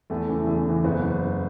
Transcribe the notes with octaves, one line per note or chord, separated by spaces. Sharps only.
E2 A3
C#3 E3
E2
C#3 E3
F#1 B3